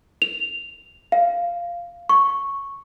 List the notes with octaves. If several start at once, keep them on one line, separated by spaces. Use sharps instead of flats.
F7
F5
C#6